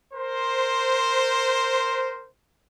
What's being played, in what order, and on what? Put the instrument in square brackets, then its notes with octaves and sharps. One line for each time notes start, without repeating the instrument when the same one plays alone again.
[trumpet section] A#4 C5